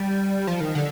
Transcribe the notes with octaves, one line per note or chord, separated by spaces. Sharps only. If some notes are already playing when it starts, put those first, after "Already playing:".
Already playing: G3
F3
D#3
D3